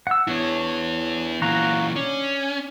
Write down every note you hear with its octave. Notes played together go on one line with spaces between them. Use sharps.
F#5 E6
B3 D4 E4 C#5
A#2 E3 F#4 F5 A#5
C#4 D4